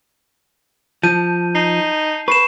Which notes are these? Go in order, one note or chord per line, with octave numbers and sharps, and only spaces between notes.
F3 A5 G6 D#7
D#4 C7
B4 C#6 C7 E7